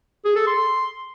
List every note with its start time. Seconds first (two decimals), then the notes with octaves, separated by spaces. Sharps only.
0.25 G#4
0.36 A4
0.47 C6